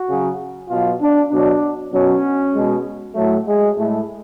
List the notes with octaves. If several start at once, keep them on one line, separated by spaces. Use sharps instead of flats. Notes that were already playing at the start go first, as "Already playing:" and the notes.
Already playing: F#4
C#3 F#3
B2 F#3 F4
D4
B2 F#3 D4
B2 F#3 C#4
B2 G#3
A2 F#3 A3
G#3
A2 G#3 A3